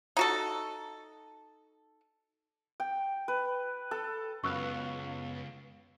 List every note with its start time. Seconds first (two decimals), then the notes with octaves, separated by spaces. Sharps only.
0.17 D#4 F#4 A4
2.80 G5
3.28 B4
3.91 A4
4.44 C#2 F#2 B3 F5 C#6 E6 F#6